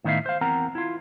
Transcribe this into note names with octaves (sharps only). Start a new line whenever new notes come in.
A2 D#3 B3 D#4 E5 F5
C5 F5
E2 C4 A#4 F#5 A#5
E4 F4